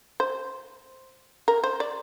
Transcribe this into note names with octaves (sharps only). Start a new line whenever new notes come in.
C5
A#4
C5
D5